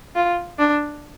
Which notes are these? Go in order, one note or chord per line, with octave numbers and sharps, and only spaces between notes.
F4
D4